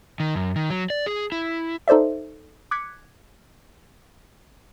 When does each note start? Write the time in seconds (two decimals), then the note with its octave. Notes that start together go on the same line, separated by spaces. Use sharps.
0.20 D#3
0.35 F#2
0.56 D#3
0.70 F#3
0.90 D5
1.06 G#4
1.32 E4
1.88 D#4 A4 C5 D5 E5
2.71 D6 F#6 G#6 B6 C#7